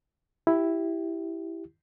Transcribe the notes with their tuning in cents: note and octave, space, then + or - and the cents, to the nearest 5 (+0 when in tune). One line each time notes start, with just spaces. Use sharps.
E4 +0 G4 -5